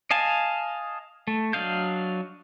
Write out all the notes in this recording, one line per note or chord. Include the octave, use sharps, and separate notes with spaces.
D#5 F5 G#5 A5
A3
F#3 D4 D#5 F5 G6